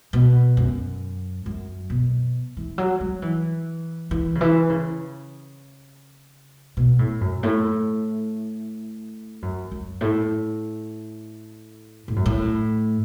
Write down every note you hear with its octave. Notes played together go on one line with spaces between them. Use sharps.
B2
F#2
F#2
B2
E3
F#3
F#3
E3
E3
C#3
E3
C#3
B2
A2
F#2
A2
F#2
F#2
A2
A2
F#2
A2